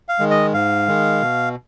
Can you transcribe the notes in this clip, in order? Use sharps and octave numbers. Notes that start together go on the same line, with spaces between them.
F5
D#3 G#3
D#5
G#2 F5
D#3 G#3
B2